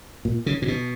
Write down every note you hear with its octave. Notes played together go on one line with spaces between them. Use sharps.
A#2
C#3
A#2
B2